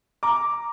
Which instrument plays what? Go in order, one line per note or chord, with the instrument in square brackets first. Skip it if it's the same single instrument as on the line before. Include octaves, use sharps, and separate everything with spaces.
[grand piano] A#5 D6